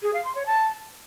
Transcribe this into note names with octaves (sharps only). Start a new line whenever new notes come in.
G#4
F5
C6
C#5
A5